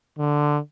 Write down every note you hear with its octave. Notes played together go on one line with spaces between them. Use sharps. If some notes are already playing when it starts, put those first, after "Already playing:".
D3